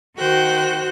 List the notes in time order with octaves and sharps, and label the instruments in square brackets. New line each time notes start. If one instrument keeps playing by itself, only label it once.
[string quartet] D#3 F#4 C5 G5 F#6